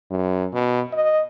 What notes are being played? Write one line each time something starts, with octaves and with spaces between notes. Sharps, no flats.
F#2
B2
D#5